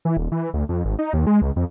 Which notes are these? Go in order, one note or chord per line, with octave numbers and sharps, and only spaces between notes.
E3
D#1
E3
D2
F2
G#1
D#4
D#2
G#3
C#2
F2